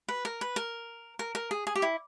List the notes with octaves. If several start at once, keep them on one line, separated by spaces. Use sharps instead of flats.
B4
A#4
B4
A#4
A#4
A#4
G#4
G#4
G4
E4